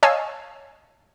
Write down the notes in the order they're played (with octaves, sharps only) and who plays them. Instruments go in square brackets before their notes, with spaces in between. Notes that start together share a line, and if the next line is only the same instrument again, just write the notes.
[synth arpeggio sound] C#5 D#5 F5 G#5 A5 E6